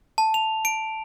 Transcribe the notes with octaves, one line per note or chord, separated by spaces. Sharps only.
A5
F7
D7